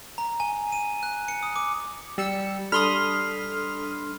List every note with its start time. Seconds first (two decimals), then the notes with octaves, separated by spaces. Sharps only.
0.18 A#5
0.40 G#5
0.72 D#7
1.03 F#6
1.28 C#7
1.43 D#6
1.56 D6
2.18 G3 E6 C#7
2.72 G3 D4 A4 B5 C6 D#6 F6